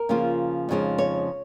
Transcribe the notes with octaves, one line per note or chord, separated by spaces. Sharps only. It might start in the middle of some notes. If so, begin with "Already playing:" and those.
Already playing: A#4
C#3 F3 A#3 F4
F2 C#3 F3 G#3 D#4
C#5